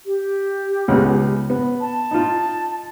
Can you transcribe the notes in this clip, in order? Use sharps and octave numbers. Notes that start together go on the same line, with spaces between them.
G4
C#2 G#3 B3
B3
A5
D#4 F4